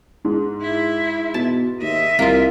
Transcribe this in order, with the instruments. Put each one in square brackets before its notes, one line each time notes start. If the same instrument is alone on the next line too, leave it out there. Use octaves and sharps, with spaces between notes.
[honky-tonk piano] G#2
[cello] E4
[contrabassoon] B2 [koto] A5
[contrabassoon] D#2 [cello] D#5 E5
[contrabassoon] C2 [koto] A#3 F4